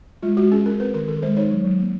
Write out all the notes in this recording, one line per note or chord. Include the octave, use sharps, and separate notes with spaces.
G#3 F4
G#3 F#4
C#4 G#4
C#4 A#4
C4 B4
D#3 A#4
D#3 A4
G#3 C5
D#4 C#5
F#3
F#3
A#3